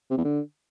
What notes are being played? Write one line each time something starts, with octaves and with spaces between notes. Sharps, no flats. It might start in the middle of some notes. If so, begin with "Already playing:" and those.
C3
E2
D3